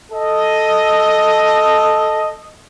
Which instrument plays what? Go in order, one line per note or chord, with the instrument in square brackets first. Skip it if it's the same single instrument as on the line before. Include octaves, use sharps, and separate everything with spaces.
[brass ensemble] A4 D#5